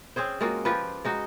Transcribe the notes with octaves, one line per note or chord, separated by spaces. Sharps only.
C4 C#4 G#4 C5
G#3 A#3 F4 F#4
F3 F4 G4 B4
G#3 D#4 F#4